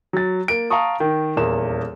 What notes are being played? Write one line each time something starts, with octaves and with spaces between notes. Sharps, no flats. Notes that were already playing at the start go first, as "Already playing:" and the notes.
F#3 A6
A#3 D7
F5 A5 A#5 C#6 D#6
D#3
D#1 E2 A#3 E7